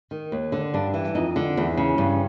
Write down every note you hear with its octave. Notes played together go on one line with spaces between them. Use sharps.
D#3
D#2
D3
G2 D4
E3
F2 D#4
D3
E2
C#3
G2